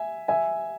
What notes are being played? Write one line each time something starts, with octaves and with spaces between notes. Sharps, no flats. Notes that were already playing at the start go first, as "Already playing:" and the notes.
Already playing: E5 G#5
E5 G#5